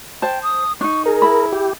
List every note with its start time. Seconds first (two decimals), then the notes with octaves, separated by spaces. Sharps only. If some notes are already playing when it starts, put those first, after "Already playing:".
0.22 C5 G5 A5
0.43 D#6
0.81 D4 D#4 C#6
1.06 G#4 A#4
1.22 E4 B5
1.53 G4